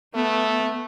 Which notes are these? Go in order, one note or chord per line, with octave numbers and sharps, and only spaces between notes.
A3 B3